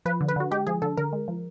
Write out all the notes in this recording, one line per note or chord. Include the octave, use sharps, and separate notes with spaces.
F3 B4
D3
B4
D3 F#4
G#3 G4
F3 G#4
D3 A4
D3 A#4
G#3
F3